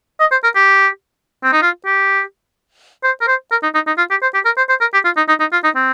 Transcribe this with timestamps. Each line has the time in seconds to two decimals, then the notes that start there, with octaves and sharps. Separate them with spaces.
0.20 D#5
0.32 C5
0.44 A#4
0.56 G4
1.44 C4
1.53 D#4
1.62 F4
1.86 G4
3.04 C5
3.21 A#4
3.28 C5
3.51 A#4
3.63 D#4
3.74 D#4
3.87 D#4
3.98 F4
4.11 G4
4.22 C5
4.34 G4
4.45 A#4
4.57 C5
4.69 C5
4.81 A#4
4.94 G4
5.05 F4
5.17 D#4
5.28 D#4
5.40 D#4
5.52 F4
5.64 D#4
5.76 C4